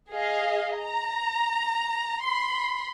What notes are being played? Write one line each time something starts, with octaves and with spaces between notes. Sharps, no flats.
G#4 D#5 F5
A#5
B5 C6